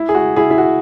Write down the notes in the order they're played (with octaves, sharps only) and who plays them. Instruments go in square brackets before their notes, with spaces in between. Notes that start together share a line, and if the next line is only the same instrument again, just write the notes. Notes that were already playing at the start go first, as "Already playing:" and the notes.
Already playing: [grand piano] E4
G#4
F#4
E4 G#4
E4
F#4